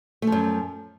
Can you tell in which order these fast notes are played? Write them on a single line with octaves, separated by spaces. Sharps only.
A3 F3 F#2